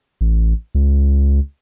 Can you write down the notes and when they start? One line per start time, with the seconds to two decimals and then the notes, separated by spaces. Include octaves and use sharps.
0.21 A1
0.75 C#2